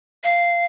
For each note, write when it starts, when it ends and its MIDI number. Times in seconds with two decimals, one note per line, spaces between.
0.24 0.65 77